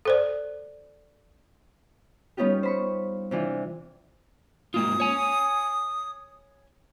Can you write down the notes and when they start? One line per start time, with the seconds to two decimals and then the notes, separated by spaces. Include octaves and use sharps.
0.05 A4 C5 D5
2.37 G3 B3 C#4 D#4 F4 G4
2.63 C5 B5 C#6
3.31 C3 E3 D4 F4
4.74 G#3 A#3 F4 D#6
5.00 C#5 G#5